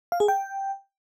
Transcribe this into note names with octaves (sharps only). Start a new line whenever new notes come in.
F5
G#4
G5